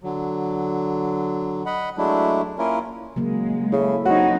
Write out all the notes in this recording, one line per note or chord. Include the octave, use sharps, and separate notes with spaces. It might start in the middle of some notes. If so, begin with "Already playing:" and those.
D3 F#3
D#5 F#5 B5
F#3 G#3 A3 D4 E4
A#3 C#4 E4 F4 A#4
C#3 F#3 G#3 A#3
C#3 E4 A4
F#3 C4 D#4 F#4 C#5